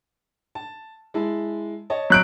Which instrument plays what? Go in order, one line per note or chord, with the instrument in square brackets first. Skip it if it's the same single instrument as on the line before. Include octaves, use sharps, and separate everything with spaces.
[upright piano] A5
G#3 E4 A5
C#5 D#5 A5
[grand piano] F#3 F#6 D7